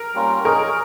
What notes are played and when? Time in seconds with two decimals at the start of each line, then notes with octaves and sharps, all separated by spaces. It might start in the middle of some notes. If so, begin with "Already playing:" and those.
Already playing: A#4
0.14 G3 A#3 C#4 F4
0.45 D#4 G#4 A#4 C#5